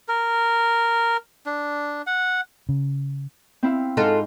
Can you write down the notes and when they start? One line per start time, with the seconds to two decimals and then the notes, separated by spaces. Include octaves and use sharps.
0.08 A#4
1.46 D4
2.07 F#5
2.69 C#3
3.63 C4 E4 F5
3.97 G#2 F4 F#4 A4